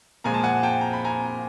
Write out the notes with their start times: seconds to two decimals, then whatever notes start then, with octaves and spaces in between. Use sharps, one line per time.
0.24 A#2 F3 G#3 G#5 A#5
0.34 A5
0.44 F#5 G#5
0.63 G5 A5
0.81 A#5
0.93 B5
1.05 G#5 A#5